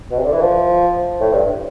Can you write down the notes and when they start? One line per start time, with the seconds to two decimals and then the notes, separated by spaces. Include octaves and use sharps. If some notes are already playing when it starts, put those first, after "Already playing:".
0.11 B2
0.19 C3
0.25 D3
0.33 E3
0.41 F3
1.21 A2
1.33 G2